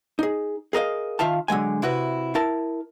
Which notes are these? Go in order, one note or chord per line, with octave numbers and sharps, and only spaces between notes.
D#4 G#4
G#4 A#4 D#5 F5
D#3 F4 E5 F5 A5
D3 F#3 G#3 G#5
C3 E4 F#4 B4
E4 A#4 A5